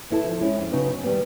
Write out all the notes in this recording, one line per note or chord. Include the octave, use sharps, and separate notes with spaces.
B3 E4 A4
F3
G#3 C#4 E4
F2
C#3 F#3 B3 D#4
F#2
D#3 G3 B3